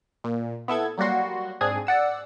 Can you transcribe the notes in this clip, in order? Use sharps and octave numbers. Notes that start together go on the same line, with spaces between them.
A#2
B3 E4 A4 G#6
F#3 G3 A#3 F#4 C6
G#2 C4 D4 G#4 D#6 G#6
D5 F#5 E6